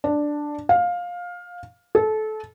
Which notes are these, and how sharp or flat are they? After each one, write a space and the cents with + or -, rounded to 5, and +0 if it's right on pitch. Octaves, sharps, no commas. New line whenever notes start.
D4 +5
F5 +20
A4 -25